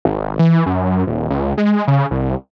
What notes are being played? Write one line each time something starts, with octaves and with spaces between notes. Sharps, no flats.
G#1
E3
F#2
D#1
C#2
G#3
C#3
C2